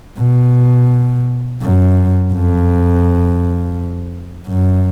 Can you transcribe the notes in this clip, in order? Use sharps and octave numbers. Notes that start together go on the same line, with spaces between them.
B2
F#2
F2
F#2